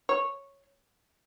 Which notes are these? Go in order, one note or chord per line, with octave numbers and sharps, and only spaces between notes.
C#5